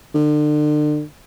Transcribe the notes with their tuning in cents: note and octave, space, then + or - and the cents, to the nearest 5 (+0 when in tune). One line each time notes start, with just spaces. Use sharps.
D3 +35